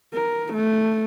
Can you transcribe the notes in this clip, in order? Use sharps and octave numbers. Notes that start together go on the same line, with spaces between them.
A#4
A3